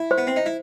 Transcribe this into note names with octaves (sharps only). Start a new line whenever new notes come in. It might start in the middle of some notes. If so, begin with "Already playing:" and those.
Already playing: E4
C5
B3
C4
D#4
E4